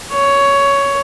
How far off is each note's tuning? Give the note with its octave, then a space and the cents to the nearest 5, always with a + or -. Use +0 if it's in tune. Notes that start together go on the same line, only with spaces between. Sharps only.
C#5 +10